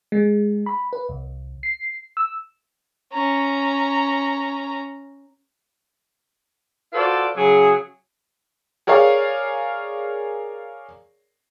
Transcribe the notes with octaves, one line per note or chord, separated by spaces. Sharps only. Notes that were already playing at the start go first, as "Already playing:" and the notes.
G#3
B5
B4
C2
C7
E6
C#4 A#5
F4 F#4 A4 B4 C5 D5
C#3 F#3 G#4
G#4 A#4 C#5 D5 F5